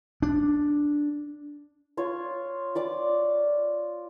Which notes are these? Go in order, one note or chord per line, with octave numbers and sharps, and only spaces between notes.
D4
F4 C#5
F4 D5 D6